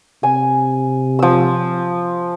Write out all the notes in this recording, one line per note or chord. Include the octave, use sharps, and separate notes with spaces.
C3 G#5
F3 E6